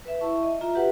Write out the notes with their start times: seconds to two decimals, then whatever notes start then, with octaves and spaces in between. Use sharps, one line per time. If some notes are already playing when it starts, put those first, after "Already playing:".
0.05 B4 E5
0.21 E4 E5 A5 C#6
0.43 D#5
0.61 F4 E5 A#5
0.75 F#4 G4 B4 F#5